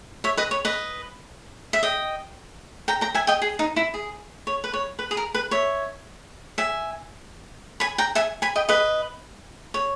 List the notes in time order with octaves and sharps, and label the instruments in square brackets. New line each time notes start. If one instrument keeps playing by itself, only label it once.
[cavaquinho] C#5 E5
B4 D#5
C#5
B4 D#5
E5
D#5 G5
G5 A#5
G5 A#5
E5 G#5
D#5 G5
G#4
D#4
E4
G#4
C#5
B4
C#5
B4
G#4
A#4
B4
C#5 E5
E5 G#5
G#5 B5
G5 A#5
E5 G#5
G#5 B5
D#5 G5
B4 D#5
C#5